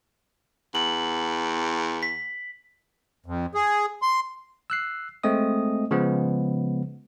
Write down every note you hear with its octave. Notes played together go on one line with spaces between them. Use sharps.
E2 F#7
B6
F2
G#4
C6
E6 F#6 C7
G#3 A3 C4 D#5 D#6
C#3 F3 G#3 B3